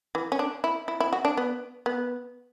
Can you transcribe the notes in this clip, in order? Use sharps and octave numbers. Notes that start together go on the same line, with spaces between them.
E3
C#4
D4
E4
E4
E4
F#4
D4
B3
B3